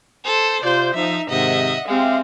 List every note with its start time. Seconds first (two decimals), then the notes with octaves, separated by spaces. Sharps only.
0.23 A4 C5
0.63 C3 F4 C5 D5 G6
0.94 F3 D#4 E5
1.30 G#2 C3 D#3 D#5 E5 F#5
1.88 G#3 C4 G4 E5 F5